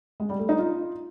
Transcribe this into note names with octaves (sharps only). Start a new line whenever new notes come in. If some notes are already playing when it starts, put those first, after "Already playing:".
G#3
G3
A3
D#4
F4